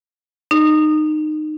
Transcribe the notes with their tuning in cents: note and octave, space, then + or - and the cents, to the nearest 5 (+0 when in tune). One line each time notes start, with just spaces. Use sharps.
D#4 -20